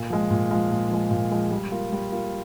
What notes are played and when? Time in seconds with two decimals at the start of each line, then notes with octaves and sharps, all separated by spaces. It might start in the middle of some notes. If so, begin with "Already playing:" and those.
Already playing: A#2
0.10 F3 G#3
0.31 A#2
0.51 F3 G#3
0.71 A#2
0.91 F3 G#3
1.11 A#2
1.31 F3 G#3
1.51 G3
1.72 A#3 F4
1.92 G3
2.12 A#3 F4